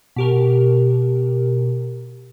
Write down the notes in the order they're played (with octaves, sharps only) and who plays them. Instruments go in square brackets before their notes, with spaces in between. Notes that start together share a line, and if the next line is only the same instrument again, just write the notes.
[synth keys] B2 G4 A#4